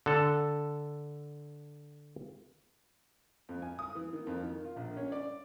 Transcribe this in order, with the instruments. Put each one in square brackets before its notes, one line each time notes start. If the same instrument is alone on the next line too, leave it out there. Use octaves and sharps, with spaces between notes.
[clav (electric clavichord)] D3 A4
[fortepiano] F2
G#5
D#6
E3
D#3
F2
D#3
F4
A#1
C#4
D5